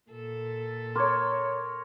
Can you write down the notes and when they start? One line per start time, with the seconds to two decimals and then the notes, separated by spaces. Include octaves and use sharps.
0.10 A#2 A4
0.96 A#4 C#5 C6 D6 G#6